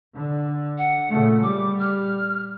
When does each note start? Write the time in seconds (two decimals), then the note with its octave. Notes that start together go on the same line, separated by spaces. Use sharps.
0.14 D3
0.77 F#5
1.11 A#2 C#3 A3
1.43 G3 D6
1.79 F6